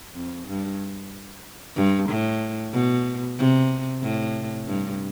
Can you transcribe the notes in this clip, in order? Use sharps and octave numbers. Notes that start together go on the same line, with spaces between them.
F2
G2
G2
A2
B2
C3
A2
G2